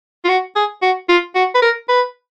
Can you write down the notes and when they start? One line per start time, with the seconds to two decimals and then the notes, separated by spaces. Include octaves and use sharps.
0.24 F4
0.28 F#4
0.56 G#4
0.82 F#4
1.09 F4
1.35 F#4
1.55 B4
1.62 A#4
1.89 B4